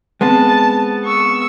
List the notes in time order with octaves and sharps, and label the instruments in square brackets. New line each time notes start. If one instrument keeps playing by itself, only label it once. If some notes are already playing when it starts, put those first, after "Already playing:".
[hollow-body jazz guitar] G#3 B3 C4 [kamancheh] A5
[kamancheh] C#6 E6